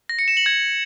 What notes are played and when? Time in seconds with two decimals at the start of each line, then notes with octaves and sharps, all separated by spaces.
0.09 A#6
0.19 C#7
0.28 E7
0.37 F#7
0.46 G#6